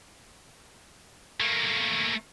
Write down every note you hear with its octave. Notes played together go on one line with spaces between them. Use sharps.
A3 A#3